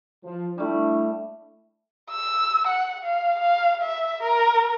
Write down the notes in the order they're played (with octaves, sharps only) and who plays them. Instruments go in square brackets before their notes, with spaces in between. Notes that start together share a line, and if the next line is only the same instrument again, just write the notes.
[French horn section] F3
[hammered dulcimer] G3 A3 [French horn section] D4 E4
[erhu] E6
F#5
F5
F5
E5
A#4